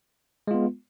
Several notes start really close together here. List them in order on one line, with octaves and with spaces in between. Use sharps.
G#3 F4 B3